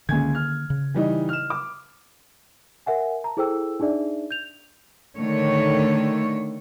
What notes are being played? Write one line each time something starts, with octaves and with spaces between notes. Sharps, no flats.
C#2 D3 D#3 A#3 G#5 G#6
F6
C#3
E3 G3 D#4
F6 E7
D6
A#4 E5 F#5 G#5
A5 A#5
E4 G#4 A4 C5 G5 E6
D4 D#4 G#4 D5 E5
G6 F7
D3 D#3 A3 C#5